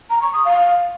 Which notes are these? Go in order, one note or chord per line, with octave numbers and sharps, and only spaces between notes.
A#5
C#6
D#6
F5